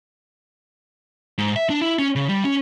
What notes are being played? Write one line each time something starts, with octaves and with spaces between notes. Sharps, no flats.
G#2
E5
D4
E4
C#4
C#3
G3
C#4